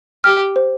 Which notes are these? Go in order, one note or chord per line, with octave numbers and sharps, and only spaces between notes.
G4 F6
C5